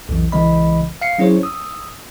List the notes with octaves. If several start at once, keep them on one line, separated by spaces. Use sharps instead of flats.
B1 F2 E3
B1 C#3 E3 G#3 D#5 B5
F5 C7 C#7
F#3 C#4 E4 G#4 C5 C#5
D#6 E6